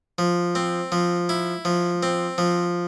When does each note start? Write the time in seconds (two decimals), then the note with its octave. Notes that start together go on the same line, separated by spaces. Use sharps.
0.18 F3
0.55 C4
0.92 F3
1.29 E4
1.65 F3
2.03 C4
2.38 F3